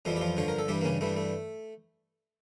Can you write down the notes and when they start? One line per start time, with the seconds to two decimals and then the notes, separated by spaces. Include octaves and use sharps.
0.05 F2 E3 F3 G3 F4
0.16 G4
0.21 F3 F4
0.37 G2 D3 F3 C#5
0.48 A#4
0.59 A4
0.68 G2 E3 G3 G4
0.81 A#3
0.84 C#3 C#4
1.01 G2 E3 G3 A3
1.17 A3